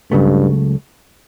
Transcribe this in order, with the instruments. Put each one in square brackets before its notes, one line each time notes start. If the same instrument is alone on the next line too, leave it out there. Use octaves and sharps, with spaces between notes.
[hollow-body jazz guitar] C#2 C#3 F#3 A3 [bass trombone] G2